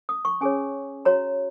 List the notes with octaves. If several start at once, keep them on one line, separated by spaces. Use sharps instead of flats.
D#6
C#6
C#4 G#4 C#5 G#5
F#4 C#5 A#5